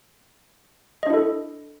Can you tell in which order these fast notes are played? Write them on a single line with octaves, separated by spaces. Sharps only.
D#5 D4 E4 A4